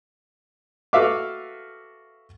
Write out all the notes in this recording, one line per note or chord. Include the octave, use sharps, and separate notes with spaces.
F#4 A4 B4 E5 F5 D6